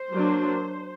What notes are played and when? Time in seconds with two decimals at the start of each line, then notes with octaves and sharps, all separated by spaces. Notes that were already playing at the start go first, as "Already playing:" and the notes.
Already playing: C5
0.12 F#3 A#3 D4